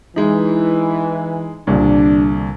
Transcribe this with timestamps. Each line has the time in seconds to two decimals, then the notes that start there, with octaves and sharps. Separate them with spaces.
0.16 E3 G#3 D#4
1.67 C2 A#2 D3 D4